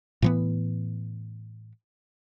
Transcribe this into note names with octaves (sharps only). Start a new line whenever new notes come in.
A2 E3 B3